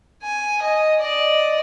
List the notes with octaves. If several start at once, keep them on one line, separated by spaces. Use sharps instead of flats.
G#5
D#5
D5 D#5